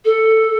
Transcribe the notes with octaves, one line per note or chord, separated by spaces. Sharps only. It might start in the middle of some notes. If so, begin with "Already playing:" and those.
A4